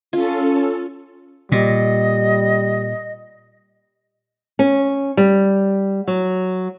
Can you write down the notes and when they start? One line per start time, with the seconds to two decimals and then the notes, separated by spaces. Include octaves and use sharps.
0.13 C#4 F4 A4
1.52 A#2 G3 D#5
4.59 C#4
5.17 G3
6.07 F#3